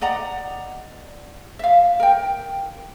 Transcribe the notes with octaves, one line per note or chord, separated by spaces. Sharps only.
D5 D#5 F#5 A#5
E5 F5
A#4 G5